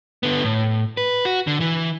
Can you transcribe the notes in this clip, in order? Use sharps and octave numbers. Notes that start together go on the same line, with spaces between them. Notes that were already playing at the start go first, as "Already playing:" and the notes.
D3 B3
A2
B4
F#4
D3
E3